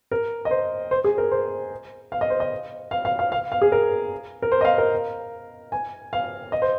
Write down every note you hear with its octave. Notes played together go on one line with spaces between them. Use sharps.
A#4
D#5
C5
C5
G#4
A#4
C5
F5
D#5
C5
D#5
F5
F5
F5
F5
F5
G#4
A#4
A#4
C5
D#5
F5
A#4
G#5
F5
D#5
C5